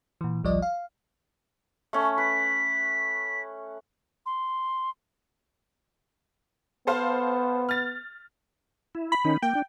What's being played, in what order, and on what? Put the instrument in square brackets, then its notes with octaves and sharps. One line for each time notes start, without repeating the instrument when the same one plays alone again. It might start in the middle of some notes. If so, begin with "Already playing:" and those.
[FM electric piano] A#2 E3
A1 D2 F3 G3 D5 D#5
F5
[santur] A3 C#4
[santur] B4 [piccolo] B6
[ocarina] C6
[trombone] B3 [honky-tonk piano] A4 C5 F5
[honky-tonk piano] F6 A6
[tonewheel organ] E4
[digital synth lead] B5
[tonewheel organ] D#3 C#4 D#4
[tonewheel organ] A#3 [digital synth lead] G5
[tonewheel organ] D4